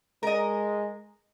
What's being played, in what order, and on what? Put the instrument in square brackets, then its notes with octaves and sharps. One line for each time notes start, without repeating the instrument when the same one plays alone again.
[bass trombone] G#3 [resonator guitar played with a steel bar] A#4 D#5